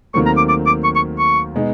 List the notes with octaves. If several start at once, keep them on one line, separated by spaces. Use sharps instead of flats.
D#2 D#3 F#3 A3 C4 C#6
A#5
D6
D6
D6
C#6
C#6
C#6
B2 G#3 B3 D#4